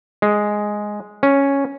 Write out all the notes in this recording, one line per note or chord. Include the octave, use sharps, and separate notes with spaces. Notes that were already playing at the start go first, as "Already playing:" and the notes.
G#3
C#4